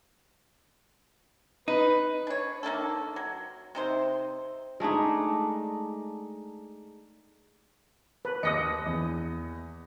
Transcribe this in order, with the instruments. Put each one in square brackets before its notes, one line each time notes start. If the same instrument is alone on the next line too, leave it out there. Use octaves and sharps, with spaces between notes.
[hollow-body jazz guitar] D#4 [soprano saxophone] B4
[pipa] D4 C#5
D#3 A#3 D4 A4
F#3
C3 D#4 C5
[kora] G#3 A3 D4 D#4
[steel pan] B4
[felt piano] D#2 [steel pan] D#5 [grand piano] D#6 A#6 C#7
[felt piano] E2